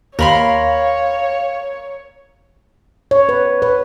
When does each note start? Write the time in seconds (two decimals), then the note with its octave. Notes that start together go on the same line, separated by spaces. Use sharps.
0.19 D#2 A#4 C#5 F5 B5 C6
3.11 C#5
3.29 B4
3.62 B4